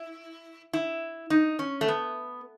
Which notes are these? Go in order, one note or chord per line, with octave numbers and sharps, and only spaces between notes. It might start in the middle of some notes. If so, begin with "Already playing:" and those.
Already playing: E4
E4
D#4
C#4
A3
B3